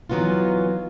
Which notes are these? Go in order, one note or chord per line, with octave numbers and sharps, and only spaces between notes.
E3 F#3 B3 D#4 F4